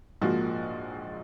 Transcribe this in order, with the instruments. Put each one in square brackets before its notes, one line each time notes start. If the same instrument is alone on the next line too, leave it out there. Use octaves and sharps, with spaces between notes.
[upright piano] A#1 G#2 F3 A#3 F#4